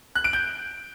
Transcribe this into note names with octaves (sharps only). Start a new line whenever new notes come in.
F#6
D7
G6